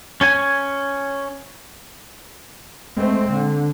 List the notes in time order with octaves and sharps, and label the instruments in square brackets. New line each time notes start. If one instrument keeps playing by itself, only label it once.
[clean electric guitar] C#4 C#5 G#5
[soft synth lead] G#3 [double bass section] A3 C4
[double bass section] D3